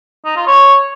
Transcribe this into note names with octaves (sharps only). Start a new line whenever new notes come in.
D#4
F4
C#5